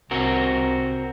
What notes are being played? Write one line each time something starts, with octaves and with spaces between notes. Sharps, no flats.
C2 C4 F#4 A#4